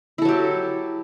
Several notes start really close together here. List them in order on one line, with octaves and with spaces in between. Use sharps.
E4 A4 F#3 G4